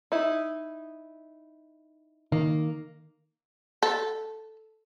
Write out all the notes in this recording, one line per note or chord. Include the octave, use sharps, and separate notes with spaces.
D#4 E4
D#3 A#3
A4